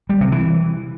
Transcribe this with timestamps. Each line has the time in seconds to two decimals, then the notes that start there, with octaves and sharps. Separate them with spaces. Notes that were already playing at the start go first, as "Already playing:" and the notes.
0.09 G3
0.21 C3
0.32 E3